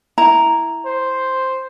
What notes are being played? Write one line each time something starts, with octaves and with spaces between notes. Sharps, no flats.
E4 A#5
C5